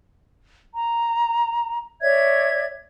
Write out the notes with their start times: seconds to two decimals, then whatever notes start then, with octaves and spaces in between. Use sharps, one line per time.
0.73 A#5
2.01 C#5 D5 E5 G#6